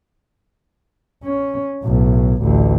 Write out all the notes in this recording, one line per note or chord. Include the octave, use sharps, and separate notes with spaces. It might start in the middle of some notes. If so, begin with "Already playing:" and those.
C#4
B1 A2
A1 D2